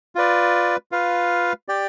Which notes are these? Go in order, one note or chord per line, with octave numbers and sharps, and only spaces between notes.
F4 B4 D5
F4 B4 F5
G4 D5 G5